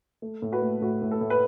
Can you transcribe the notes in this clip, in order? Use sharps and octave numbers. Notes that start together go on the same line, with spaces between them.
A3
A2
F#4 B4
A3
A2 F#4
A2
A4
A2
B4